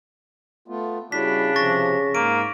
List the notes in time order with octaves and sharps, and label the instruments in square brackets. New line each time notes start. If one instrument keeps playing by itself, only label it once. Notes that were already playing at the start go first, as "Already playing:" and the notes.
[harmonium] A3 B3 F4
[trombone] C#3 [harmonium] G3 E4 F#4 [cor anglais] D4 [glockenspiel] B6
[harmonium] C3 F3 [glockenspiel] C#6 A6 A#6
[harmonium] G#2 [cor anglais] A#3 [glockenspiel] D7